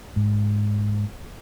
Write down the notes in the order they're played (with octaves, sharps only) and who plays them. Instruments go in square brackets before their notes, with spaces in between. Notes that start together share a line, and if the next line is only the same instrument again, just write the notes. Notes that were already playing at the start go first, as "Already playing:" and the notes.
[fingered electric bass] G#2